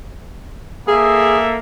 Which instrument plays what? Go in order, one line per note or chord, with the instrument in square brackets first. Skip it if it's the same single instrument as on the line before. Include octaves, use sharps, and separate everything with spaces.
[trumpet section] A#3 A4 E5 [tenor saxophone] G#4